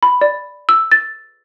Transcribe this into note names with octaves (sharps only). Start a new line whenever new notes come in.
B5
D5
E6
A6